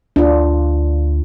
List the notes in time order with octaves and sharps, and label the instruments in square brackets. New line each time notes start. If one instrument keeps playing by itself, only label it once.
[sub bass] D2 [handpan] D4 F4